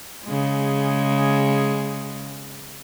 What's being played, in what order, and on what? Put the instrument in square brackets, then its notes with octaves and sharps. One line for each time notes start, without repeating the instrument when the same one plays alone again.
[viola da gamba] C#3 G#3